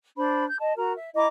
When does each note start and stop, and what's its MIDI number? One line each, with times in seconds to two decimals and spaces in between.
0.17 0.44 62
0.17 0.44 72
0.17 0.44 83
0.48 0.59 91
0.60 0.73 75
0.60 0.73 81
0.77 0.94 66
0.77 0.94 70
0.77 0.94 82
0.95 1.10 76
1.15 1.27 64
1.15 1.27 75
1.15 1.27 82
1.15 1.27 86